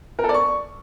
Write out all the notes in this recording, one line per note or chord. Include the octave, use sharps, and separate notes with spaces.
A#4
A4
D5
C#6